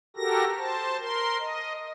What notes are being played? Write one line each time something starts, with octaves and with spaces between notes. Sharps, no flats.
F#4 G4 A4 A#4 A#6
C5 A5
A#4 C6
D#5